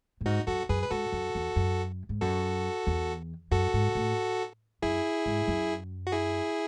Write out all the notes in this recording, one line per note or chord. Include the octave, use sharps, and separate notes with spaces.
A2
G#2 D#4 F#4
F#2 F#4 A4
F#2 G#4 B4
B4
G#2 F#4 A4
F#2
E2
F#2
G#2
F#2 F#4 A4
E2
F#2 F#4 A4
G#2
A2
F#2 E4 G#4
G#2
F#2
F#4
E4 G#4